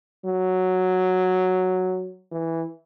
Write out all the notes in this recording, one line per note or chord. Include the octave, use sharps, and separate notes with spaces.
F#3
E3